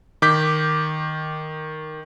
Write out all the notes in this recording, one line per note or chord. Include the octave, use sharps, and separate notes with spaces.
D#3 D6 G6 B6